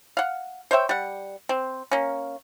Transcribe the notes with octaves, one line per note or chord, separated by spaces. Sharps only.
F5 F#5
C5 C#5 E5 G5
G3 F#5
C4
A#3 C#4